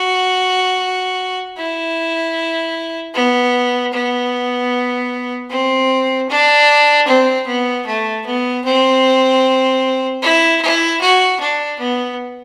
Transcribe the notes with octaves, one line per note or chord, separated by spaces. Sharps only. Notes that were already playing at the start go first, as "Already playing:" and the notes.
Already playing: F#4
E4
B3
B3
C4
D4
C4
B3
A3
B3
C4
E4
E4
F#4
D4
B3